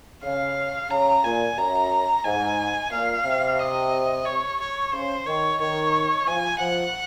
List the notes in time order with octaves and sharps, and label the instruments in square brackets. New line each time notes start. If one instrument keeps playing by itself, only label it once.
[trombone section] C#3 [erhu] F5
[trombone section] C#3 [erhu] A#5
[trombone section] A#2 [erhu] G#5
[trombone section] F#2 [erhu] A#5
[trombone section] G#2 [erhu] G#5
[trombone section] A#2 [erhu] F5
[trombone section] C3
[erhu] D#5
C#5
C#5
[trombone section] C#3 [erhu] C5
[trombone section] D#3 [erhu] C#5
[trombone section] D#3 [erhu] C#5
[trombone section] F3 [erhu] G#5
[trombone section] F3 [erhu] F#5